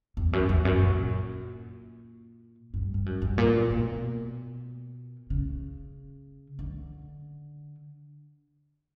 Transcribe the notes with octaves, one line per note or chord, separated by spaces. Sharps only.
E2
F#2
E2
F#2
A#2
G2
G2
F#2
G2
A#2
B2
C#3
D3